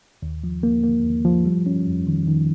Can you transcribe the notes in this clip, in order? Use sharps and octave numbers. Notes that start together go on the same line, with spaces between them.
D#2
F3
A#3
A#3
D#2
F3
G3
C#4
F2
D#3
D#3